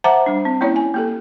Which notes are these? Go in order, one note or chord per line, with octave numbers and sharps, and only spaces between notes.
C5 E5 F#5 A5 A#5 D6
G3 D4
C4
A#3 C#4 E4 C#5 D5
G#5
A#3 G4 A4